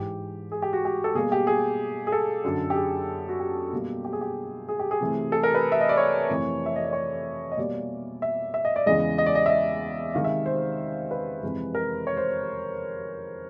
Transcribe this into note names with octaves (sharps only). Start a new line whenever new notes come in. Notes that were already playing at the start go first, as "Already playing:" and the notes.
Already playing: G#2 E3 G#3 G4
G#4
G4
F#4
G4
A4
B2 G3 A#3 G#4
G4
G#4
G#4
A4
F#2 D3 F#3
G4
G#4
F#4
G4
B2 G3 A#3
G4
G#4
G4
G#4
G4
G#4
C3 E3 A3
A4
A#4
B4
E5
D#5
D5
C#5
F2 C3 E3 A3
E5
D#5
D5
C#5
D#5
B2 G3 A#3 D5
E5
E5
D#5
D5
E2 C#3 E3 G#3 D#5
D#5
D5
D#5
E5
D#5
C3 D#3 G#3 F5
E5
C5
B4
F2 C3 E3 G#3
A#4
C#5
C5